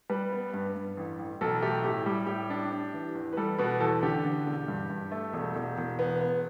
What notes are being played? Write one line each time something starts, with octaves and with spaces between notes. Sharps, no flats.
G3 B4
B3
G2
G2
A1
A1
B1 A4
A3 G4
A2 G4
G3 G4
A2 G4
D4
D4
E3
E2
B4
G3 A4
B2 B4
E2 A4
D3 G4
D3
E1
G2
G2
A3
E1
E1
E1
B3
B3